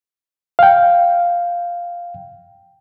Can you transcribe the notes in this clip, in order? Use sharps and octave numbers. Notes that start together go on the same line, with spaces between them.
F5 G5